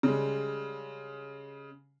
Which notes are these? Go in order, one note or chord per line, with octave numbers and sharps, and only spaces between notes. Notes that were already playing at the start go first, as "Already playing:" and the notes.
C#3 G3 G#3